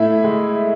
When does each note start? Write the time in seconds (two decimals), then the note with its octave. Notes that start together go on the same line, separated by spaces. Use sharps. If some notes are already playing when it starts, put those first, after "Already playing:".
Already playing: A2 E4 E5
0.24 G#3